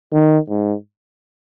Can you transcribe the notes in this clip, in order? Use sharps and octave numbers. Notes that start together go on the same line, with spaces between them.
D#3
G#2